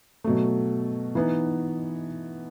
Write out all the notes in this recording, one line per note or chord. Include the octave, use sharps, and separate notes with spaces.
B2 F#3 A3
E3 B3 D#4